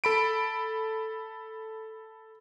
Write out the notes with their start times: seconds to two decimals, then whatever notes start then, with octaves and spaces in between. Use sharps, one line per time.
0.04 A4 B5 D7